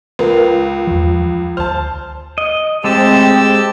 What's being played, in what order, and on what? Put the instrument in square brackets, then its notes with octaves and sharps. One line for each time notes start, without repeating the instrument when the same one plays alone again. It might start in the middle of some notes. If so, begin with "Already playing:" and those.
[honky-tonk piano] C#2 [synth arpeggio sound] A#4 B4
[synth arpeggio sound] E2 F3
[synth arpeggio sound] D2 F6 [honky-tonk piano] C5 A5
[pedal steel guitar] D#5
[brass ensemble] A2 C3 C4 [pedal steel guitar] G#3 [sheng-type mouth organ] G4 A5 E6